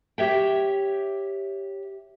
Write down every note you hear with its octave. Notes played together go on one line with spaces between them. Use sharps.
G4 C#5 E5 G5